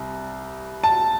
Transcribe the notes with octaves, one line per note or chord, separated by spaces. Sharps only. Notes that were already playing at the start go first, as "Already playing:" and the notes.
Already playing: C2 G3
A5